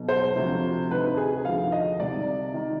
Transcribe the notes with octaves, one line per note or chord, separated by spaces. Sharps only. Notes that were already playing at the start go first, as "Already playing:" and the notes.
Already playing: B1 B2
C5
D2 C3 F3
D2 C3 D#3 B4
G#4
D2 D3 F3 F5
D#5
C2 C3 D#3 D5
D#3